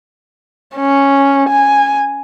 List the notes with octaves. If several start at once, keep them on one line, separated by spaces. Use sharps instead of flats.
C#4
G#5